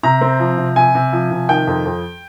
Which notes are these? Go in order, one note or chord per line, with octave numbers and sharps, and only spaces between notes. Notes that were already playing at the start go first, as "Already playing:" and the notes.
C3 A#5
C4
F3
C3
C3 G#5
C3
F3
C3
D#3 G5
F2
F2